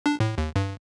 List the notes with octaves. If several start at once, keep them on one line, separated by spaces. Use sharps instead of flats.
D4
A2
D#2
G2